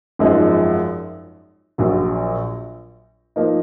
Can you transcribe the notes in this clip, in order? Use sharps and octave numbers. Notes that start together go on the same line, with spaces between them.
G#1 F#2 F3 G#3
A#1 A#2 F#3
F3 A#3 D#4